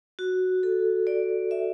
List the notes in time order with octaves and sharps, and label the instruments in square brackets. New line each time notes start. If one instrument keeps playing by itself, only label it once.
[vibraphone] F#4
A4
D5
E5